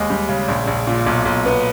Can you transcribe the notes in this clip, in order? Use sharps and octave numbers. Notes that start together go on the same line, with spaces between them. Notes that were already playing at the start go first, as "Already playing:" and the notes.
Already playing: D#2 G#3 D#5
G3
C#3
A#1
A#1
A#2
B1
B1
B3